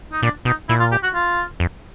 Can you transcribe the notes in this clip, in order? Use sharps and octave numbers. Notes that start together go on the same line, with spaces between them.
D#4
A#2 D4
B2 D#4
A#2 E4
F4
G4
F#4
F4
F2